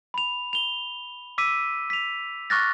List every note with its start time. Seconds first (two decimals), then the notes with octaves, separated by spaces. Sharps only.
0.14 B5 F7
0.53 F7 G7
1.38 D6 E6 B6 D#7
1.90 B6 F7
2.50 C#6 D6 F6 F#6 A6 A#6